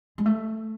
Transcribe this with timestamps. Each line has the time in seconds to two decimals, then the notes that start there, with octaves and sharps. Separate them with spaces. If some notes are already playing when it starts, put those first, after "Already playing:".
0.18 G#3
0.26 A3